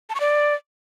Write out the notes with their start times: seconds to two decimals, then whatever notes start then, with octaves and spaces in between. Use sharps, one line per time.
0.10 A5
0.15 C#6
0.20 D5